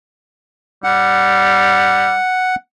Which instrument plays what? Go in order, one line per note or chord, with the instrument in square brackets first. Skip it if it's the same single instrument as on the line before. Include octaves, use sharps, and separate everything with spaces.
[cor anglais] G3 [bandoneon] F#5